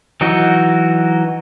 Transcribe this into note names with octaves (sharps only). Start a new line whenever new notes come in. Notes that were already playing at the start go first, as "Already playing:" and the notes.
E3 F#3 D#4 F#4